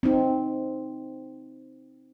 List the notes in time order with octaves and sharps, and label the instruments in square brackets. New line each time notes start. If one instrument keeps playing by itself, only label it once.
[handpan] C4 D#4